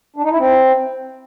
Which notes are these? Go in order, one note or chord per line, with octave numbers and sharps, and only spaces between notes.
D4
D#4
E4
C4